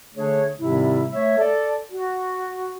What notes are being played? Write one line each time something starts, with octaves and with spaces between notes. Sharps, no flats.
D3 A3 D4 G#4 C#5
G#2 C3 D#3 G3 C4 E4
A3 C#5 E5
A4 D5
F#4